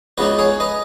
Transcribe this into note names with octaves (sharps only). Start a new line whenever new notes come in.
C#2 C#3 B3 D#4 F#4 B4
G#4 C#5
B4 D#5